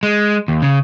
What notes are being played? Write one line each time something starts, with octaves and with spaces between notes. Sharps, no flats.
G#3
D#2
C#3